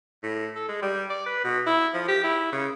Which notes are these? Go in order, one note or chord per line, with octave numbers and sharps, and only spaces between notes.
A2
A4
G#3
G3
D5
B4
B2
E4
F3
G4
E4
C#3